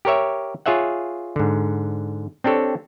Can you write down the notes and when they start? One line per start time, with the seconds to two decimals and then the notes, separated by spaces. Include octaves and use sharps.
0.05 G4 A#4 C#5 E5
0.66 F4 G#4 C#5 E5 F#5
1.36 G#2 D3
2.44 C4 D4 G4 A4 C#5